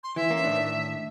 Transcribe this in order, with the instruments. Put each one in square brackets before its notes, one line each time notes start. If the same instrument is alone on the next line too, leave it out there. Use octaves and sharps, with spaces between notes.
[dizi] C6
[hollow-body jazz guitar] E3 [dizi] E5
[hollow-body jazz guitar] A#3 C#4
A2 D#3 D4